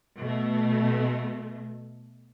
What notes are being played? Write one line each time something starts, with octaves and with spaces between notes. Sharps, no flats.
B2 A3